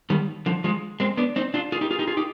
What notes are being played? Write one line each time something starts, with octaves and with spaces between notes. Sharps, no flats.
D#3 G3
D3 F3
F3 G#3
G#3 C4
B3 D4
C4 D#4
D4 F4
F4 G#4
D#4 G4
F4 G#4
D#4 G4
F4 G#4
D#4 G4